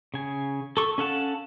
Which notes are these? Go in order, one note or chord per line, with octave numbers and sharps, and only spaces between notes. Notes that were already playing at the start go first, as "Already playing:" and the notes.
C#3 G#5
A4 C#6
C#4 A4 F5 F#5 A5